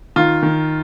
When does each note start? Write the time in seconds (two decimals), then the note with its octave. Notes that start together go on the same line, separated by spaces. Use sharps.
0.16 D#3 F4
0.43 D#3